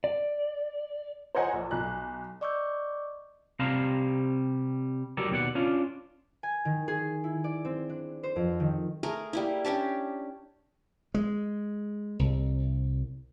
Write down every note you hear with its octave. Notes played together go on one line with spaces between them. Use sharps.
D5
C5 C#5 D#5 F#5 G#5 A#5
A#1
B1 F#6
D5 D#5 C#6 D6 E6 G6
C3 G3 F5 A5 A#5 C6
F#3 G4 A4 A#4 D5
D#2 B2 D5 F#5
C#4 D4 F4
G#5
D#3
G#4
E4
D5
C4
D4
C5
F2
D#3
A3 G#4 A#4
G3 A#3 E4
C#4 D4 G4 A5
G#3
C2